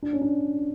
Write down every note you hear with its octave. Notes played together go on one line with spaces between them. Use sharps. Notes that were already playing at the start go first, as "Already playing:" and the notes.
D4
C#4
D4